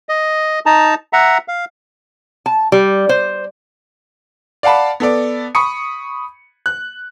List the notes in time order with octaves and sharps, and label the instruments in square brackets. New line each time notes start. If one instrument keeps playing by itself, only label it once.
[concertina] D#5
D#4 A5 A#5
E5 F#5 A#5
F5
[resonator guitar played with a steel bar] A5
G3
C5
[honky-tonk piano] D5 F5 F#5 A5 B5
B3 A4 D5
B5 C#6 D#6 C#7
F#6